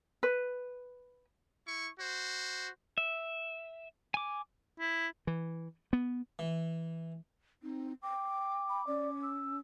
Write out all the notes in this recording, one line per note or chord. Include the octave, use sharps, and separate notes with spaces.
B4
E4 C#6
F#4 C5
E5
G#5 D6
E4
E3
B3
E3
C4 D#4
G5 D6
B5
C#4 D5
E6